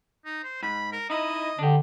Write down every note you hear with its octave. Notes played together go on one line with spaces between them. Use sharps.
D#4
C5
G#2 B5
A#4
D#4 E4 D#5
D3 D4 G4